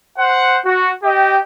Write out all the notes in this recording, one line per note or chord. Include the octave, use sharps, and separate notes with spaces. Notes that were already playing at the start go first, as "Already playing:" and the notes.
C5 F#5
F#4
G4 D#5 G5